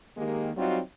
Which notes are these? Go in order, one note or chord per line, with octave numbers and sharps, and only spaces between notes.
D#3 G#3 A#3 G4
F#3 G3 C4 D#4 F4 F#4